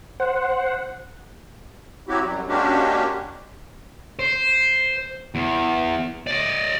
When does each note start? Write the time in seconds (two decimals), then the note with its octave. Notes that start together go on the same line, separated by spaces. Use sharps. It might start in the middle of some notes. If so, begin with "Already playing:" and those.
0.20 C5 F#5
2.08 F#3 C4 E4 F#4 G4
2.24 F#2 F#3 G3
2.48 G#3 A#3 C#4 D4 F#4 G4
4.19 C5
5.35 E2
6.27 D5 D#5